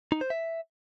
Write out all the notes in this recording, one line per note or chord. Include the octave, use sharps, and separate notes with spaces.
D#4
C5
E5